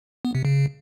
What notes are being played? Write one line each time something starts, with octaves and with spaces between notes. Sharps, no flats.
B3
C3
C#3